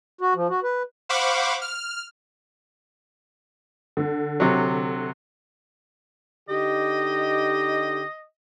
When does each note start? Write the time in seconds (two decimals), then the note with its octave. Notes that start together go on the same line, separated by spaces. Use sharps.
0.21 F#4
0.35 F3
0.49 F#4
0.63 B4
1.09 C5 F5 F#5 B5 C#6 D6
1.62 F6
3.97 D3
4.40 C3 F#3
6.49 D3 D#4 G4 D#5